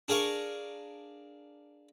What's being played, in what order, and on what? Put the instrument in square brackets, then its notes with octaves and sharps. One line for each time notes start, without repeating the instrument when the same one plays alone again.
[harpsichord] D4 G#4 A#4 F5 C#6